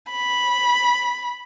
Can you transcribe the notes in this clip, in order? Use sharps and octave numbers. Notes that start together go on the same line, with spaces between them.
B5